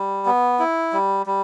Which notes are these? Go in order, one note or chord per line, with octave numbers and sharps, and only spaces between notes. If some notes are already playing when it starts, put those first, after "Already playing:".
Already playing: G3
B3
E4
G3
G3